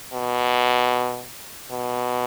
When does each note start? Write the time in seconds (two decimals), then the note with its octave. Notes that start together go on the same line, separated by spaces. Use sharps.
0.13 B2
1.71 B2